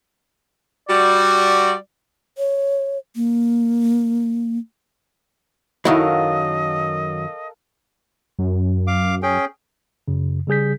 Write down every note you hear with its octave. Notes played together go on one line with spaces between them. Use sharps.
G3 F#4 D5
C#5
A#3
F#2 D#3 F#3 E4 A4 A#4 D#5 F5
F#2
F5 D6
C#4 G#4 G5
F#2 C#3
C#3 G3 G#4 G6 B6